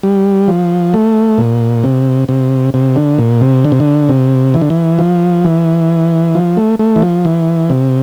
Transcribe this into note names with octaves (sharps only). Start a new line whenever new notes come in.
G3
F3
A3
A#2
C3
C3
C3
D3
A#2
C3
D3
C3
D3
C3
E3
D3
E3
F3
E3
F3
A3
A3
E3
F3
E3
C3